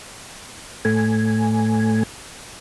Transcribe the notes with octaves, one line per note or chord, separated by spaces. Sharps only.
A2 A3 G#5